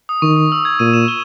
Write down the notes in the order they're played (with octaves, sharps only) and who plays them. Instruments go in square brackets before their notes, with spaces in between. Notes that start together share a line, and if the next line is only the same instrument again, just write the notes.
[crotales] D#6
[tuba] D#3 [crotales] C#6
[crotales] D#6
E6
G#6
[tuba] A#2 [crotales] D#7
[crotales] E7
G7